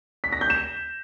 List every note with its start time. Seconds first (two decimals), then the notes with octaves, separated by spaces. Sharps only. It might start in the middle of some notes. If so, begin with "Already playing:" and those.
0.24 B6
0.32 A#6
0.41 G6
0.50 E7